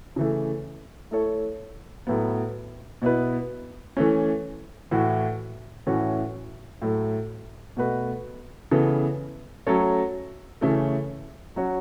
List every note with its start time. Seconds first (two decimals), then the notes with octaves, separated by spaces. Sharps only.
0.16 C#3 E3 A3
1.11 A3 E4 A4 C#5
2.07 A2 F#3 B3
3.02 B2 B3 E4 B4
3.97 E3 A3 C#4
4.91 A2 E3 A3 F#4
5.87 A2 E3 C#4 F#4 A4
6.82 A2 F#3 A3
7.77 B2 A3 F#4 B4
8.71 C#3 E3 B3 A4
9.67 F#3 A3 C#4 A4 C#5
10.61 C#3 E3 A3 C#4 A4
11.56 F#3 C#4 F#4 C#5